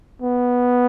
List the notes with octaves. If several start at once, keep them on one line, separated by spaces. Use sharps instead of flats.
B3